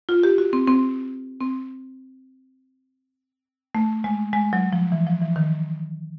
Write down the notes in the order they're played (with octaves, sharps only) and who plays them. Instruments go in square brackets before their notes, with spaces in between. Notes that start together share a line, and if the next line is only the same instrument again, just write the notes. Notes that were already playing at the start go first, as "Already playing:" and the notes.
[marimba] F4
G4
F#4
C4
C4
C4
A3
G#3
G#3
F#3
F3
E3
F3
E3
D#3